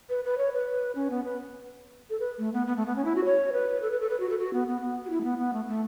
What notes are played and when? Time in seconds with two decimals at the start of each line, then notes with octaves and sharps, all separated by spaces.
0.09 B4
0.24 B4
0.38 C#5
0.53 B4
0.95 C#4
1.10 B3
1.24 B4
2.10 A4
2.20 B4
2.38 A3
2.53 B3
2.67 B3
2.76 A3
2.86 B3
2.96 C#4
3.05 E4
3.15 F#4
3.25 C#5
3.53 B4
3.82 A4
3.91 B4
4.00 A4
4.09 B4
4.20 F#4
4.29 A4
4.38 F#4
4.53 B3
4.68 B3
4.81 B3
5.05 F#4
5.10 E4
5.21 A3
5.24 B3
5.38 B3
5.53 A3
5.68 A3